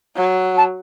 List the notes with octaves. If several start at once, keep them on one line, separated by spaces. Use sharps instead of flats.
F#3
A5